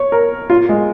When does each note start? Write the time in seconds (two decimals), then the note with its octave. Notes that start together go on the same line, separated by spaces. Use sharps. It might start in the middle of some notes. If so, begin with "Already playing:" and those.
Already playing: C#5
0.12 A#4
0.50 F4
0.69 G#3